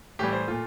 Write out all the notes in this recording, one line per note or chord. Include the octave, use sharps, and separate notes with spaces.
A2 E3 G3 G4
C5
A#2 A3 F4